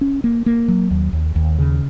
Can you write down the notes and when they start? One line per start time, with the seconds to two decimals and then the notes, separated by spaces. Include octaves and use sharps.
0.01 C#4
0.24 A#3
0.46 A#3
0.68 F#3
0.91 D#2
1.13 D#2
1.36 D#2
1.59 C#3